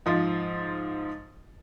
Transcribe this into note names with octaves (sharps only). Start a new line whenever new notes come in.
G#2 F3 F4